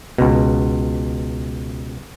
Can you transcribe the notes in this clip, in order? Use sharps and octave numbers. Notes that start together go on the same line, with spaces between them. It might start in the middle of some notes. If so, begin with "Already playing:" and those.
C#2 B2